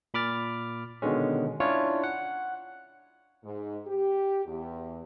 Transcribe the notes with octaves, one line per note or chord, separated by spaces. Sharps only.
A#2 B5 D6 F6 A6
B2 D3 D#3 G#3 C#4
C#4 D4 E4 F4 C#5
F#5
G#2
G4
E2